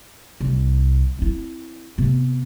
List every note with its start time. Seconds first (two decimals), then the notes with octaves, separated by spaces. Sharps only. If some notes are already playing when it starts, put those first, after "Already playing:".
0.40 C2
1.18 C4 E4
1.98 C3 B3